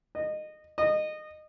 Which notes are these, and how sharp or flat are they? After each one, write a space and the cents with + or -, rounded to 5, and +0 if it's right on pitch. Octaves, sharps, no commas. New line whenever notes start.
D#5 -20
D#5 -20